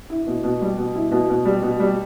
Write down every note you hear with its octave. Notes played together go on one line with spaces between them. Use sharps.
E4
B2
B2
G3
B2
E4
B2
B2
G3
B2
G3